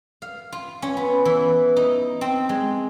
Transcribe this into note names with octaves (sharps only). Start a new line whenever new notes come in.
F5
F4
C#4
B3
E3
D#4
C4
G#3